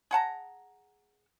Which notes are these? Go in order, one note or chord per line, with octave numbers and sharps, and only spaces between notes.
G#4 F#5 A5 A#5